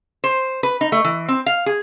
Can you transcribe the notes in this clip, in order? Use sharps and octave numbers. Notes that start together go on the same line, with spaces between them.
C5
B4
D#4
A3
E3
C4
F5
G#4